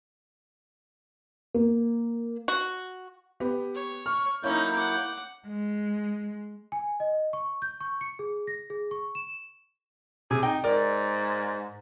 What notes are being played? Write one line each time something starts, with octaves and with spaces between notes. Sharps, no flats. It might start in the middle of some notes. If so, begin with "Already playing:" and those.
A#3
F#4
B3 G4
C#5
C#6 F6
F#3 A#3 C#4 D#4 E4 C#5 G6
F#5 D6
G#3
G#5
D#5
C#6
G6
C#6
C#7
G#4
A#6
G#4
C#6
E7
C3 G#4
D#4 G5
G#2 A#4 D5